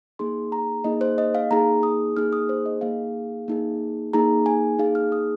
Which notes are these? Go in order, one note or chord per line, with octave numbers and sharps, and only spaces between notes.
A#3 D#4 G#4 C6
A#5
A#3 D#4 G#4 D#5
C5
D#5
F5
A#3 D#4 G#4 A#5
D#6
A#3 D#4 G#4 F6
D#6
C5
D#5
A#3 D#4 G#4 F5
A#3 D#4 G#4
A#3 D#4 G#4 A#5
G#5
A#3 D#4 G#4 F5
F6
D#6